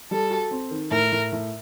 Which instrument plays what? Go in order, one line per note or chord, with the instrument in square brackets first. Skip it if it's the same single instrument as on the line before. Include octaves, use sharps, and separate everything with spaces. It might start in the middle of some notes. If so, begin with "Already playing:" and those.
[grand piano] G3 [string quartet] A4
[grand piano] F#4
C4
D#3
[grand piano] A2 [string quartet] A#4
[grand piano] A2
A2